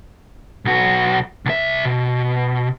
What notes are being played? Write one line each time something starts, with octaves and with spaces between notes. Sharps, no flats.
B1 F#4
C2 E5
B2